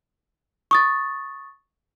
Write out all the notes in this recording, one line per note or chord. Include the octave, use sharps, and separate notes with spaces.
C#6 D#6 A6